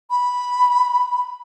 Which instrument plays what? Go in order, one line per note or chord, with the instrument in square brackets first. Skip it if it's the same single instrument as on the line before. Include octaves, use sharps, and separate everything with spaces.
[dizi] B5